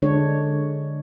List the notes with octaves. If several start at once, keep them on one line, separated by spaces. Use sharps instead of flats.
D3 G#3 D4 C#5